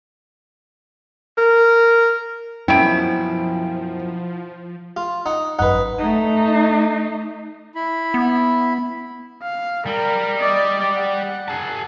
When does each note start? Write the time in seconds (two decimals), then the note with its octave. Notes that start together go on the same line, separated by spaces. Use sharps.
1.38 A#4
2.68 F#2 B2 F3 C4 E4 G5 D7
4.97 F4
5.26 D#4 F#5
5.59 G#1 F#2 D#4 B4 F#5
5.99 A3 D#4
7.75 E4 B5
8.14 B3
9.42 F5
9.86 G3 A#4
10.39 D5 D#5
10.93 F#5
11.48 G#4 A5